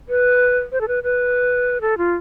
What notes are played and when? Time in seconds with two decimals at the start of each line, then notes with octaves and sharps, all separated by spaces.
0.09 B4
0.72 C5
0.81 A4
0.88 B4
1.03 B4
1.81 A4
1.98 F4